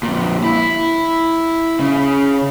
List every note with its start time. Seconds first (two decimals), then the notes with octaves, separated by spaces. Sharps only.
0.03 F2 A#2
0.44 E4
1.80 C#3